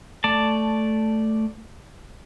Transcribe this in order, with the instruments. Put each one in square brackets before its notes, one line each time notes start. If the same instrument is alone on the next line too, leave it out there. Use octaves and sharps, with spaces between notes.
[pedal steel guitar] A3 D5 A5